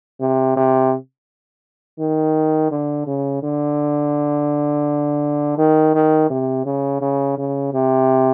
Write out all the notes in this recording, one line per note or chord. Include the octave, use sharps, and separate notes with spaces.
C3
C3
D#3
D3
C#3
D3
D#3
D#3
C3
C#3
C#3
C#3
C3